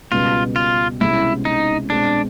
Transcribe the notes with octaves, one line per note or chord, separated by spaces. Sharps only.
C#2 B2 G3 F4
F4
C2 B2 G#3 C#4 E4
D#4
B2 G#3 C4 D4